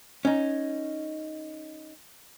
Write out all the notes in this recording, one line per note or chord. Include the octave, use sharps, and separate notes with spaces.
C#4 D#4